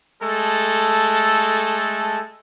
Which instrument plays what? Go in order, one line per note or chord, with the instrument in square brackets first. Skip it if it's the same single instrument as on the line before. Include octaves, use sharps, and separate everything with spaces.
[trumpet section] G#3 A3 A4